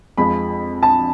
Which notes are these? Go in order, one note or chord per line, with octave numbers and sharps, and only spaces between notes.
F2 F3 G#3 B5
A5